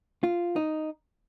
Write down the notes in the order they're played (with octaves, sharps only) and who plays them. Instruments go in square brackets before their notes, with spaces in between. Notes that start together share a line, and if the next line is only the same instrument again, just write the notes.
[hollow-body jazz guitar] F4
D#4